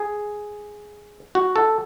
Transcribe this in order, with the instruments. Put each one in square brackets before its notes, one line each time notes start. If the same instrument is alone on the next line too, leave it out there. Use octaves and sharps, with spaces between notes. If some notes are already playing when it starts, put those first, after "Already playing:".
Already playing: [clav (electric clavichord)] G#4
F#4
A4